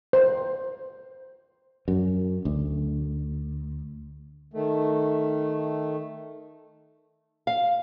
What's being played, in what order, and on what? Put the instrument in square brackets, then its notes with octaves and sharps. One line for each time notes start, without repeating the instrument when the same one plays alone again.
[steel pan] C5
[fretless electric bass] F#2
D2
[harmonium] D#3 A3
[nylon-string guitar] F5